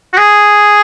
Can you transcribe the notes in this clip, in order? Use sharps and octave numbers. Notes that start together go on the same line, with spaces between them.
F#4
G#4